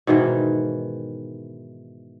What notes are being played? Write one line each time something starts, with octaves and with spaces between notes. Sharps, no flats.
G#2 B2 D#3 E3